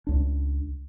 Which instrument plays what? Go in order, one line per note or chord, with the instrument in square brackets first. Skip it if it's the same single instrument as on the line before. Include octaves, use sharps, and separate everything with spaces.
[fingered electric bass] C#2 D4